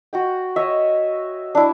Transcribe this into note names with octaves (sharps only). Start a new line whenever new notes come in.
F#4 F#5 G5
C#5 D#5 E5
D4 E4